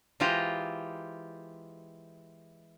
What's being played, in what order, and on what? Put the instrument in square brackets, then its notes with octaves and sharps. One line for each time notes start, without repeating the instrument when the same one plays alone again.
[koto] E3 G#3 F4 G4 C5 A#5